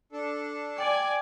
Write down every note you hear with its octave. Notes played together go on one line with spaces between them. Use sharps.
D4 A4
D5 G5 G#5